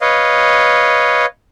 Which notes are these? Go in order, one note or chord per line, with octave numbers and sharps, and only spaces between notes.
B4 C#5 D#5 F5